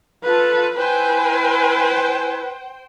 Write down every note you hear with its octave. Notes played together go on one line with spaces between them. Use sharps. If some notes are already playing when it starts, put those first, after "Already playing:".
F4 A4 B4
E4 B4 C5 G5 G#5